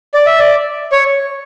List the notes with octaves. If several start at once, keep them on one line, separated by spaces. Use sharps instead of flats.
D5
E5
D5
C#5